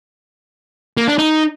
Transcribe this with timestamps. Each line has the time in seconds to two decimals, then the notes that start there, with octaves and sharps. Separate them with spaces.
0.97 A#3
1.08 D4
1.18 D#4